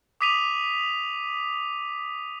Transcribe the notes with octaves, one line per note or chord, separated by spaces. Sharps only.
D6 D#6 B6 D#7 F7